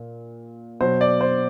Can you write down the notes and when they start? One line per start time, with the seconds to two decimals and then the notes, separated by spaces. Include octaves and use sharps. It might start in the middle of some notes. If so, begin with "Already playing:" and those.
Already playing: A#2
0.81 B2 F#3 C5
1.01 D5
1.21 C5